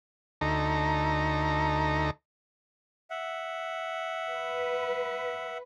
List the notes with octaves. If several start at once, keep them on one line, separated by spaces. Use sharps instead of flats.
D2 D#4 A4 A#5
E5 F#5
B4